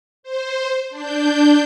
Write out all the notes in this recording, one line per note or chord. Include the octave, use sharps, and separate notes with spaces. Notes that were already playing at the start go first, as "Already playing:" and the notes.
C5
D4 G6